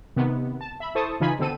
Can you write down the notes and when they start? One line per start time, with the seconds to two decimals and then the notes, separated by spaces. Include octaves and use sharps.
0.16 C3 D#3 B3
0.61 A5
0.80 E5 B5
0.95 E4 A4 C5 A5 C#6 D#6
1.20 C#3 E3 D#4 F4 G#5 B5
1.39 B2 D3 C4 A4 E6 D#7